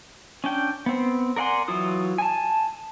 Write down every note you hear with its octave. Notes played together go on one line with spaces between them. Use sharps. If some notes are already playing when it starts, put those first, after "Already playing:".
C#4 D4 G5
B3 C4
A#4 D5 F#5 G#5 C6
E3 F#3 F4 D#6
G#5 A5